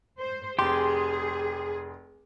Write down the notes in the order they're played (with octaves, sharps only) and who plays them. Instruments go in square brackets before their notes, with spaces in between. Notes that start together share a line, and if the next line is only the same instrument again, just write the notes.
[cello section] C5
[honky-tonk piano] F1 C6 [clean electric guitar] G4 [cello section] G#4